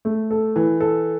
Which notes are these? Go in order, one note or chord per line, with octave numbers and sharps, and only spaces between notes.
A3
A4
E3
A4